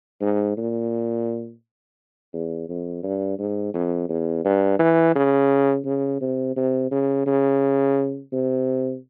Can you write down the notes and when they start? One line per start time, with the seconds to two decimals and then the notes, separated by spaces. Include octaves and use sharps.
0.21 G#2
0.57 A#2
2.34 E2
2.69 F2
3.03 G2
3.39 G#2
3.74 F2
4.09 E2
4.45 G2
4.79 E3
5.16 C#3
5.85 C#3
6.21 C3
6.56 C3
6.91 C#3
7.26 C#3
8.33 C3